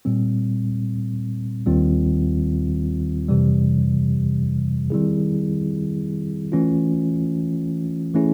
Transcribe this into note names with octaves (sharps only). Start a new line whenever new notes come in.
A#2 G3 C4
D#2 D#3 G3 C4 F4
F2 C3 E3 G3
D#3 G3 C4 E4 G#4
E3 A3 C#4 F4
E3 A3 C#4 E4 G#4